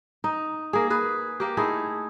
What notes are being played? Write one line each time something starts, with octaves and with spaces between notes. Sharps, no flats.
D#4
A#3 G#4
G#4 B4
A#3 G4
A3 D#4 E4 G#4